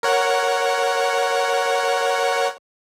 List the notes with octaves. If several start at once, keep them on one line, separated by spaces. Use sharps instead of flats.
A#4 C#5 F#5